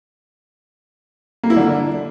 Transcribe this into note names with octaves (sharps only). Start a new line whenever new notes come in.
A#3
E4
D3